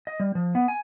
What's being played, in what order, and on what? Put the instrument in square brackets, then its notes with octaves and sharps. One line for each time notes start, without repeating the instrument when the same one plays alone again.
[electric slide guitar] D#5
G3
F3
B3
G#5